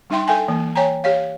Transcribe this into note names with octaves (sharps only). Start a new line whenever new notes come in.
G3 D4 D#4 E5 G5 C6
A4 E5 G5 G#5
E3 A#3
C#5 G5 G#5 A#5
G4 C#5 F5